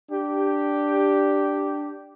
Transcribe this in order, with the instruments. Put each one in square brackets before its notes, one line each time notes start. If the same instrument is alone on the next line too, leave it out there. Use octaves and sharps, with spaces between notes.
[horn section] D4 G4